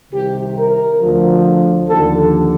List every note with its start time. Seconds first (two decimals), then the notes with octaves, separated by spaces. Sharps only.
0.10 C2 C3 D#3 G4
0.55 A#4
1.01 D2 D3 F3
1.90 D#2 D3 F3 A4